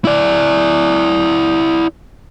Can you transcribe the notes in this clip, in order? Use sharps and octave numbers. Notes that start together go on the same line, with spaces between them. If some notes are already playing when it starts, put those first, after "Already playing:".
E4 D5